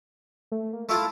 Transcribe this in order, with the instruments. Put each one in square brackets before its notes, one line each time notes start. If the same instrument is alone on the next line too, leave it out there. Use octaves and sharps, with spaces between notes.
[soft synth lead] A3
A#3
[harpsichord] A3 E4 F4 [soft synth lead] A5